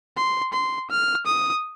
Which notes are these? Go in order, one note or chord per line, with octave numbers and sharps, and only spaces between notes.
C6
C6
F6
D#6